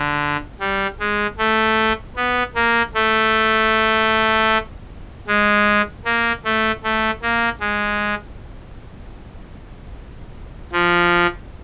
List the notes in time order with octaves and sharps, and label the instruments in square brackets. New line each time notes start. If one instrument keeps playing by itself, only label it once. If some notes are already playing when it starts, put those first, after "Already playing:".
Already playing: [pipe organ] D3
G3
G#3
A3
B3
A#3
A3
G#3
A#3
A3
A3
A#3
G#3
F3